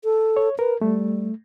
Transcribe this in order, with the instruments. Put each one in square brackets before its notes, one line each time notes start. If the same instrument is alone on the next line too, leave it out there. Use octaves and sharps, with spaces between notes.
[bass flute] A4
[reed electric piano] C#5
[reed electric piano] A#4 [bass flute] B4
[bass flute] G3 [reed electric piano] A3